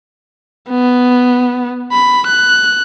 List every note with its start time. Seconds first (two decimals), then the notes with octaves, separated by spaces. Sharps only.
0.69 B3
1.92 B5
2.27 F#6